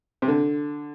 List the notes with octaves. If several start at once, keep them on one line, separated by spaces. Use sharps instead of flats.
C3
D3